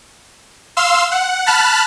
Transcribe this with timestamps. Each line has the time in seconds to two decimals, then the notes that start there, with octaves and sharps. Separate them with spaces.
0.77 F5 C6 E6
1.12 F#5
1.46 A5 B5 F6 F#6